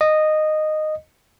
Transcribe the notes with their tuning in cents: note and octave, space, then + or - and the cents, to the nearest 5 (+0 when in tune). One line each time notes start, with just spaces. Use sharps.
D#5 -10